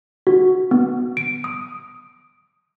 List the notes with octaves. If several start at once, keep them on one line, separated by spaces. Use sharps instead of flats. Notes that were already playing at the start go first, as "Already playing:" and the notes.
F#4
B3
D7
D#6